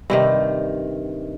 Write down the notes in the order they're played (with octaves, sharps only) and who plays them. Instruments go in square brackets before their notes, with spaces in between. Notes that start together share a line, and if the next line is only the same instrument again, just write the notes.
[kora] G2 C3 D#3